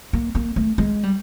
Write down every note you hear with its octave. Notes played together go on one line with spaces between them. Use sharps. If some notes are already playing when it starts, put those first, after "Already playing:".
A#3
A#3
A3
G#3
G3